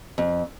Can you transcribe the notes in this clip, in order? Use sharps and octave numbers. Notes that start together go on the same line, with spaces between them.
F2